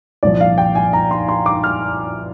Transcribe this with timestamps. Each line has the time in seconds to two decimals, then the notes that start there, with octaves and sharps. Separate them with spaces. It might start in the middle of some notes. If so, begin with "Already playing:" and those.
0.23 C2 A#2 F3 D5
0.40 F5
0.58 G5
0.75 G#5
0.93 A#5
1.11 C6
1.29 C6
1.46 D6
1.64 F6